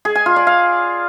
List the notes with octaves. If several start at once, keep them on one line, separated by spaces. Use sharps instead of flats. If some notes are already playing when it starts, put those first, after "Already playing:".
G#4
G#5
F4
D5
F5